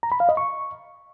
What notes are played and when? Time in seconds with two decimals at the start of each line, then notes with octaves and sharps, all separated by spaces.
0.03 A#5
0.12 B5
0.20 F5
0.29 D#5
0.37 C#6